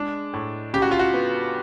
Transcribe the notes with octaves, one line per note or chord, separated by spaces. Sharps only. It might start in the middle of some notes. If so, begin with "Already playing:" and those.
Already playing: G#3 D4
A2
C#3 G4
F#4
F4
F#4
B3